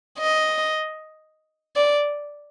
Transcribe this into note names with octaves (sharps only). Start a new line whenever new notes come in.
D#5
D5